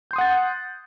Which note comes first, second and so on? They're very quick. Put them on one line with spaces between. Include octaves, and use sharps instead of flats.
G6 C6 D#6 F#5 A6